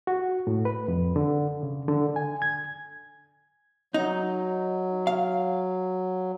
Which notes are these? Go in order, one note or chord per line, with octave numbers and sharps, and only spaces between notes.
F#4
A2
B4
F2
D3
C#3
D3
G#5
G#6
F#3 D#4
F5